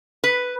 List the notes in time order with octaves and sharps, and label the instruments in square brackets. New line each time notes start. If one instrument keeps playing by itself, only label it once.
[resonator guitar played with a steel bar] B4